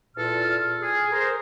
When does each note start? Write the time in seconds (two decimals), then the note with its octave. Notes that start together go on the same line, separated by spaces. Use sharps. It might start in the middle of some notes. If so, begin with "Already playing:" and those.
0.16 E2 A#2 A4 F6
0.82 G#4
1.12 A#4 C5